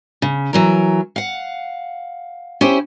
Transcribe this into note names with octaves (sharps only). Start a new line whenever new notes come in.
C#3
E3 F#3 A#4
F5 F#5
C#4 E4 G4 C5